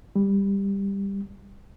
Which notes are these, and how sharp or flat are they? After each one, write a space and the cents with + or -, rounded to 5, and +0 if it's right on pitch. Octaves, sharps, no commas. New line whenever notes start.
G3 +15